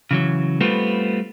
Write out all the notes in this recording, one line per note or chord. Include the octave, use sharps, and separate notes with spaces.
C#3 E3 F#3
G3 A3 B3 C4 F4 B4